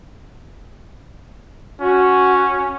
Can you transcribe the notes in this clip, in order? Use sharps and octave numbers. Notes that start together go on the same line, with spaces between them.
C#4 F#4